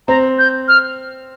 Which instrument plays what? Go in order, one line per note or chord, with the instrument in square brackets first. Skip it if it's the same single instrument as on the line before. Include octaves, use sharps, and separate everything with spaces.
[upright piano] C4 [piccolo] A#5
[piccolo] G6
F6